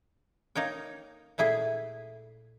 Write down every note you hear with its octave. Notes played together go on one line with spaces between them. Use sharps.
A#3 D#4 C#5 G5
A#2 A3 E4 G#4